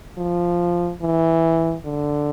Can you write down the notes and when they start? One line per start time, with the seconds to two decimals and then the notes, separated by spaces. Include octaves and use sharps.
0.18 F3
1.01 E3
1.85 D3